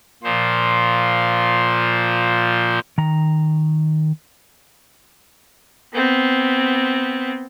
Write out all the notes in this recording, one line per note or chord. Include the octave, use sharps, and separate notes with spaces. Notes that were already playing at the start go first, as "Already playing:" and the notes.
A#2 F3 C5
D#3 A#5
B3 C4